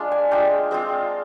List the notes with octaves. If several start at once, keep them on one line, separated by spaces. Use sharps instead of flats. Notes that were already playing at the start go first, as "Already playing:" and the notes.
Already playing: G#3 D4 F4
G#5
G#3 D4 F4 G5
G#3 C4 F4